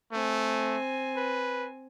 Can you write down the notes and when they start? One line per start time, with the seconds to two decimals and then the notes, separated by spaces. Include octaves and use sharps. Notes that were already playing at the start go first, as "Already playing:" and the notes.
0.12 A3 C4 G#5
1.17 B4